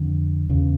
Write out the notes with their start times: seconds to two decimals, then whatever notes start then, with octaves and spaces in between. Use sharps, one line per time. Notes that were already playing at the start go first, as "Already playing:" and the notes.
Already playing: F2 D3
0.49 E2 C#3